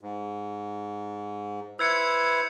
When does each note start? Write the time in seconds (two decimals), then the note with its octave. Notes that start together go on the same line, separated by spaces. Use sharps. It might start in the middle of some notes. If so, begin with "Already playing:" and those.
0.01 G#2
1.79 E4 B4 C5 E6 G#6 C#7